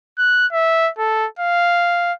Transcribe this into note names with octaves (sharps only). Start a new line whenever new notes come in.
F#6
E5
A4
F5